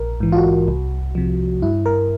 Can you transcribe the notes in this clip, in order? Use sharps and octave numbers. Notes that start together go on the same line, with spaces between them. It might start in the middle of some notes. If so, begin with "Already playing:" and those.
Already playing: A#1 A#4
G#2 E3
F4
F#4
C2
C3 F3
G2 E4
A#4